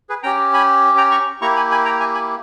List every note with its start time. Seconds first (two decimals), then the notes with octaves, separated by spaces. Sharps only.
0.09 G#4 B4
0.23 C#4 G4 G5 A#5
0.53 G#5 B5
0.97 G5 A#5
1.11 A#5 C#6
1.41 A#3 E4 G4 A#5 C#6
1.56 G#5 B5
1.71 G#5 B5
1.85 G5 A#5
2.00 E5 G#5
2.14 G#5 B5